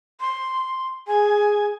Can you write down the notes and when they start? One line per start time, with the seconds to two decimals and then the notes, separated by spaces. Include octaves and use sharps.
0.21 C6
1.07 G#4 G#5